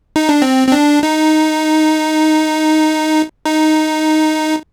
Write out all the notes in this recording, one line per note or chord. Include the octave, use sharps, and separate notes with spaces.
D#4
D4
C4
C4
D4
D#4
D#4